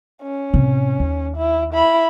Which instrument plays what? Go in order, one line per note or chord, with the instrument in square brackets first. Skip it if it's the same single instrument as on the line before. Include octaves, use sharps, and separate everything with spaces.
[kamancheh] C#4
[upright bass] A1 C3
D#2
[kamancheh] E4
E4 B5